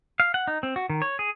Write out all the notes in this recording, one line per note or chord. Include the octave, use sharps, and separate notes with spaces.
F5
F#5
D#4
C4
F#4
D#3
C#5
G#4